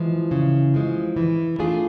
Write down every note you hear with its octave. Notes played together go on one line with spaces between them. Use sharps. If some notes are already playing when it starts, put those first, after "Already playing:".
Already playing: E3 F3 G#3
C#3
F3 G#3
E3
A3 D4 F4 G#4